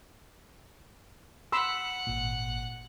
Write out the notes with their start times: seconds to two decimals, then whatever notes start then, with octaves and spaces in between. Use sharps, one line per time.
1.52 F#5 B5 C6 E6
2.07 G#1 A#2